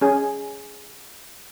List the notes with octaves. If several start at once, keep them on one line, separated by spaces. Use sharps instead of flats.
C#4 G#4